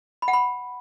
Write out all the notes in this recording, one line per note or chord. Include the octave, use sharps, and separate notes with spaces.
B5
F#5
B5